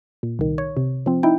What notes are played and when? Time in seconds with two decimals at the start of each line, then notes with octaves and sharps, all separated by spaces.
0.23 A#2
0.39 C2 D#3
0.58 C#5
0.77 C3
1.06 F3 C4
1.23 D#4 E4 G5